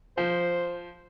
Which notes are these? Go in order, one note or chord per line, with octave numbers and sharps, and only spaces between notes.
F3 C5